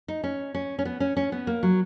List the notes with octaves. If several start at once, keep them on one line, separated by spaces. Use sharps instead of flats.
D#4
C#4
C#4
C#4
B3
C#4
C#4
B3
A#3
F#3